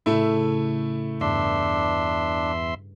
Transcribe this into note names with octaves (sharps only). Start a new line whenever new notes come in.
A2 C#3 A3 E4
E2 G2 D4 E5 C6